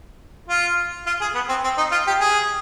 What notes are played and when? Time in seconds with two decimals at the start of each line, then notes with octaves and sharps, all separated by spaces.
0.49 F4
1.07 F4
1.21 G#4
1.35 B3
1.49 C4
1.64 C4
1.78 D#4
1.92 F4
2.07 G4
2.20 G#4